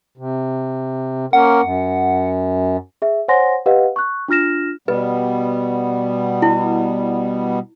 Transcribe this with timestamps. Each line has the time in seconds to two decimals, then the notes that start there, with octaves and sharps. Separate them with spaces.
0.18 C3
1.33 A#3 C#4 A#4 F#5
1.62 F#2
3.02 G#4 E5
3.28 C5 C#5 F#5 G#5 C6 A#6
3.66 G4 B4 D#5 F5 F#5
3.96 C#6 F#6
4.28 D4 F4 F6 A#6 E7
4.88 B2 G3 B3 B4
6.42 E4